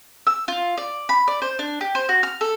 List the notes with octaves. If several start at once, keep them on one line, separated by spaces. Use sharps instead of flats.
E6
F4
D5
B5
D5
C5
D4
G4
C5
F#4
F6
A4